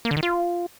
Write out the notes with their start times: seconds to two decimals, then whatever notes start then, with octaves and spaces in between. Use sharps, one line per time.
0.05 A#3
0.11 D3
0.17 D#3
0.23 F4